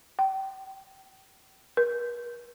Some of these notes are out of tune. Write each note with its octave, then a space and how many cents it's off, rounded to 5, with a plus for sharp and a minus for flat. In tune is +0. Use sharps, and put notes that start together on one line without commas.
G5 -35
A#4 +45